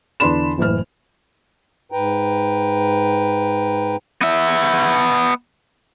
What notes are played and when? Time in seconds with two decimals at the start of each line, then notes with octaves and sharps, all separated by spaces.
0.20 E2 D3 D4 B5 C6 E7
0.58 F#1 A2 E3 F6
1.92 G#2 B4 G5 A#5
4.21 B3 E5